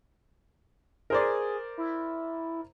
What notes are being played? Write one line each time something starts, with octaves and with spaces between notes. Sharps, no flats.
G#4 A#4 C5 D5
E4